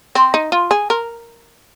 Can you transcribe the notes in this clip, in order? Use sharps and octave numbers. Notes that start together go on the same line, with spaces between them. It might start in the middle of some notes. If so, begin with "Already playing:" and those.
C4
D#4
F4
G#4
A#4